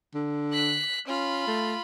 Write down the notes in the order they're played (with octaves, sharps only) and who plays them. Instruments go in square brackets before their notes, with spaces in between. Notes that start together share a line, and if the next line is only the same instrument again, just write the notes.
[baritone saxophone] D3
[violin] F#6 B6
[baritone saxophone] C#4 [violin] F4 B5
[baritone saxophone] A3